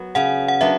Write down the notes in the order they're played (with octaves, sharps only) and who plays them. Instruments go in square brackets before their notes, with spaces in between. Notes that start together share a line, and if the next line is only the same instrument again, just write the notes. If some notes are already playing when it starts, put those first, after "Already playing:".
Already playing: [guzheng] F#3 B3
[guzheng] C#3 [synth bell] F#5
[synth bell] F#5
[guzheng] F#3 B3 D4 [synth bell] E5